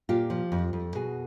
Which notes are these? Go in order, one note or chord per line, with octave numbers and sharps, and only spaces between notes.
A#2 F4 G4
F3
F2
F2
B2 F#4 G#4